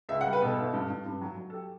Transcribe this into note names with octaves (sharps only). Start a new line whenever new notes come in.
C#2 E5
F#5
G3
B4
B2 A4
G1
G2
G2
G2
F#3
F#3
A4
G4